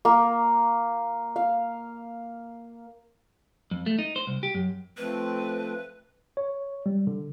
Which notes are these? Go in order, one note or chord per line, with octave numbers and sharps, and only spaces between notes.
A#3
F5
F2
A3
D#4
C5
C2
G4
F#2
F3 A3 C4 B4
C#5
G3
D3